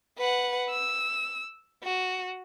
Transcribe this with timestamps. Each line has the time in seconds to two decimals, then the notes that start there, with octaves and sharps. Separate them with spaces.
0.18 B4 F#5
0.70 E6
1.84 F#4